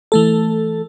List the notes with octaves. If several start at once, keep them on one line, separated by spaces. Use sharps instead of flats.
E3 A3 A4